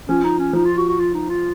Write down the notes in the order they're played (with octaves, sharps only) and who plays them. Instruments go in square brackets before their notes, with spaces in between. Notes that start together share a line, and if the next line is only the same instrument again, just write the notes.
[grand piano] F3 [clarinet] C#4
[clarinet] D#4
C#4
[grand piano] F3 [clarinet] D#4
[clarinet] F4
F#4
F#4
F4
D#4
F4